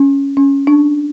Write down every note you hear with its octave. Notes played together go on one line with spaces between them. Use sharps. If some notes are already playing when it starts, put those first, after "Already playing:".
Already playing: C#4
C#4
D4